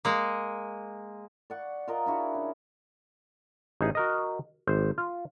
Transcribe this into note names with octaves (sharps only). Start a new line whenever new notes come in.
G#3 A#3
D5 F#5 C#6
F4 A#4 D#5
D4 E4 F#4 G#4
C#3
A1 D#4 G#4
F#4 A#4 D#5
G#1 C5
F4